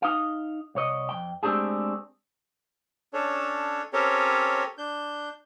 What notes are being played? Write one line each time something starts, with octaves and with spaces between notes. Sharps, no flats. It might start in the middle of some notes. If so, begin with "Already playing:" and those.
D#4 F5
C2 C#5 D#5
F2 G5
G#3 A3 C4 D4 G4 G#4
C#4 D4 A4 C#5
C4 C#4 G4 A4 A#4 C#5
D4 G6